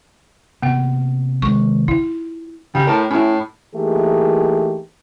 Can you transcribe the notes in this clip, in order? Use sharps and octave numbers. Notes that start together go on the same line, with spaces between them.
C3 A#3 B3 G5
D#3 G#3 C#6
E4 F4
C#3 G3
A2 A#4 G5 A5
A2 C#4 E4
E3 A3 A#3 D#4 G4 G#4